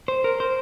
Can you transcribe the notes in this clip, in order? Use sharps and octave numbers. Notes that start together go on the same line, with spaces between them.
C5
A#4
C5